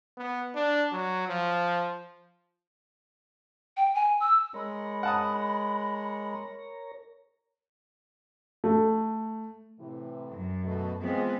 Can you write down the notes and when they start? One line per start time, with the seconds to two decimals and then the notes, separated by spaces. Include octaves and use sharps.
0.17 B3
0.55 D4
0.92 F#3
1.28 F3
3.77 G5
3.94 G#5
4.20 E6
4.54 G#3 A#4 C#5 A#5 B5
5.03 F#5 A5 D#6
8.64 A3
9.79 A2 C3 E3
10.31 F#2
10.64 B2 A3
11.02 E3 G#3 B3 C4 F4